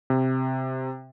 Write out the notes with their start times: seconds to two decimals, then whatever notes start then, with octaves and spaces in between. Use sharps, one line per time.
0.10 C3